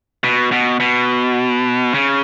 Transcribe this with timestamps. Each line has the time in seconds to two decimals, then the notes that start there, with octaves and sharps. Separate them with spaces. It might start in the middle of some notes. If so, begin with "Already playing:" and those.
0.24 B2
0.52 B2
0.80 B2
1.94 C#3